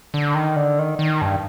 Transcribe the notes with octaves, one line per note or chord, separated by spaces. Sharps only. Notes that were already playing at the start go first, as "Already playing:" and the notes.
D3
D#3
D3
D#3
D#3
G2